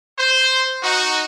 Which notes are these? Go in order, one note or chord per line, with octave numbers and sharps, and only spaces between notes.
C5
D#4 F#4